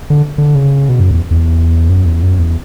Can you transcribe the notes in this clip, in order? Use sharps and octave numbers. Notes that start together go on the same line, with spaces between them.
D3
D3
C#3
B2
F#2
E2
E2
F#2
E2
F#2
E2